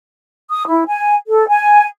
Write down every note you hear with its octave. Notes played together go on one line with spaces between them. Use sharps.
D#6
E4
G#5
A4
G#5